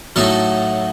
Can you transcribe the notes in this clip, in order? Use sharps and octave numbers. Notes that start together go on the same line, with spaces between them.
A2 F#3 A3 D#4 A4